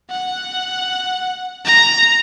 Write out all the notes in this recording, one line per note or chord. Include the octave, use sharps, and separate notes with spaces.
F#5
A#5